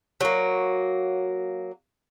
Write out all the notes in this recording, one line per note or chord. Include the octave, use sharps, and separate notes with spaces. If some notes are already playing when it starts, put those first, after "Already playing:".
F#3 A#3